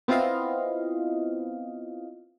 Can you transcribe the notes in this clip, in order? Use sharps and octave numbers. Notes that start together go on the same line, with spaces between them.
B3 C4 E4 F4 D#5 F5